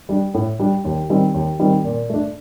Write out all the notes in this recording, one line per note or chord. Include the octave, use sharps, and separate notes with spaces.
G3 D4
A2
G3 D4
D#2
D#3 G3 C4
D#2
D#3 G3 C4
A#2
A3 D4